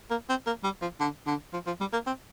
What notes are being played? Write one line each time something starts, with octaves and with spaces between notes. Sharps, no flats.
A#3
C4
A#3
G3
F3
D3
D3
F3
F3
G3
A#3
C4